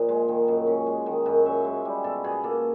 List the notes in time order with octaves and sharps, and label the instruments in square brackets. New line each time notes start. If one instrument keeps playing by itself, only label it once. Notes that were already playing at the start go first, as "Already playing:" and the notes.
Already playing: [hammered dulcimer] A#2 F3 D#5
G#3
D#3
F#2
C#4
G#3
D#3 D#5
F#2
C#4 E5
G#3
G3
B2 A4
B2 G#4
A#3 A4